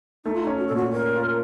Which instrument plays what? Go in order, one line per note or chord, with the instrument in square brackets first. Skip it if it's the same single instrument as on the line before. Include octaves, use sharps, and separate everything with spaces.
[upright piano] A3 [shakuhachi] D#4
[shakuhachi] F4
D#4
[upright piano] C#4
[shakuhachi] F#4
A4
[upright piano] A#2
[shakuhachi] F#4
[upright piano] C#4 [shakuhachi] A#4
[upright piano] F4